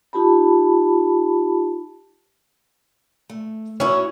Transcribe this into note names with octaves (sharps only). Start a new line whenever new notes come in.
D#4 F4 G4 A5 B5
A3
C#4 E4 F#4 C#5